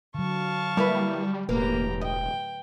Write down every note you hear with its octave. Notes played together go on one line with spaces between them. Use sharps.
D3 F#3 F5 A5 C#6
G3 A#3 E4 B4
E1 A2 A#3 G4 B4 A#5
D#5 G5